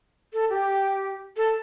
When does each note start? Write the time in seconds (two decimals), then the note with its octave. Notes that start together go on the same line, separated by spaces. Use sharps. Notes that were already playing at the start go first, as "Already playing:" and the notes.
0.33 A4
0.50 G4
1.37 A4